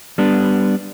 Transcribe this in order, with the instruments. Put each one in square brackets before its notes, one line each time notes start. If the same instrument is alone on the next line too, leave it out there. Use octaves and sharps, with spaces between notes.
[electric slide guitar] G3 B3 D4